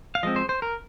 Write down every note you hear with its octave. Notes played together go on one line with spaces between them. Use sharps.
F5
F3 G#3 C4 D#5
C5
C5
A#4